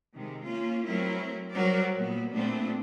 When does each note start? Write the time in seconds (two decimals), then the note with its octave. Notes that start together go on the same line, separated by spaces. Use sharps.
0.14 C3 D#3 G#3
0.46 A#3 C#4 F4
0.85 F#3 A3 C4 E4 A#4
1.53 F#3 G3 A#4 C5 D5
1.97 A#2 B3
2.33 A#2 A3 B3 C4 D4